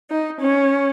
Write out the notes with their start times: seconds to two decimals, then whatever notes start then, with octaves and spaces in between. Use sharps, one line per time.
0.10 D#4
0.39 C#4